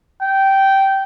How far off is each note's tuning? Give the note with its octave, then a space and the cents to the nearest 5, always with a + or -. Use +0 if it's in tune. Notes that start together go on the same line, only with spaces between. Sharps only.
G5 -15